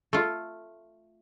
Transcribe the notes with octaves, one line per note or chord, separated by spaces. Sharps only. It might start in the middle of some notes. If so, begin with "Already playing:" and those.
A3 F4